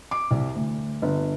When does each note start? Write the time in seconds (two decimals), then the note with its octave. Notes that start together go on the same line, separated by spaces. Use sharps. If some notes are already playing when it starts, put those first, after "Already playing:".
0.11 D6
0.31 C2
0.55 D2
1.02 G1